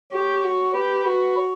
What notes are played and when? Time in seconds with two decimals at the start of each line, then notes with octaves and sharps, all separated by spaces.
0.12 G4 C#5
0.44 F#4
0.74 G4 B4
1.05 F#4 B4
1.37 C#5